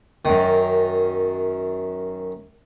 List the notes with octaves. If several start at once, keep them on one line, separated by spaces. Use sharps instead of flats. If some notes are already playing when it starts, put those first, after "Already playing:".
F#2 D#3